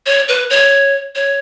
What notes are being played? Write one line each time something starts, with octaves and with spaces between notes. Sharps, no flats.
C#5
B4
C#5
C#5